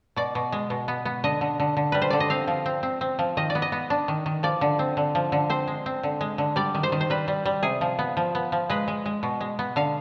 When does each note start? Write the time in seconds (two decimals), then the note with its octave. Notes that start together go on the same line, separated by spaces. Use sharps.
0.16 B2 D5
0.35 B2
0.52 G#3
0.70 B2
0.88 B3
1.05 B3
1.24 D3 D#5
1.41 D3
1.60 D3
1.77 D3
1.92 G3 B4
2.02 C5
2.10 D3 D5
2.20 D#5
2.30 C4 F5
2.47 F3
2.66 C4
2.83 C4
3.01 C4
3.19 F3
3.37 D#3 D#5
3.50 D5
3.55 B3
3.62 D#5
3.72 B3
3.90 D4
4.08 D#3
4.26 D#3
4.43 F3 D5
4.61 D3
4.79 C4
4.97 D3
5.15 F3
5.32 D3
5.50 C4 C5
5.67 G#3
5.86 C4
6.03 D3
6.21 G#3
6.38 D3
6.56 G3 D5
6.75 D#3
6.83 C5
6.92 D#3
7.01 C5
7.10 G3 B4
7.28 G3
7.45 G3
7.63 C3 G#4
7.81 F3
7.99 B3
8.17 F3
8.35 B3
8.52 F3
8.70 G#3 B4
8.88 G#3
9.06 G#3
9.23 B2
9.41 G#3
9.59 B3
9.76 D3 F5